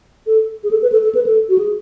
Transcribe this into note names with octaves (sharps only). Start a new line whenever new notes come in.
A4
G#4
A4
B4
A4
A4
B4
A4
F#4
G#4